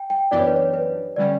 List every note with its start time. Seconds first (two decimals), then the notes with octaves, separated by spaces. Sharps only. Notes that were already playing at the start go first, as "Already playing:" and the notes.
Already playing: G5
0.10 G5
0.31 F#2 E3 B3 D4 G4 D5
0.40 C#5
0.47 B4
0.56 C#5
0.74 B4
1.16 D3 G3 C#4 D5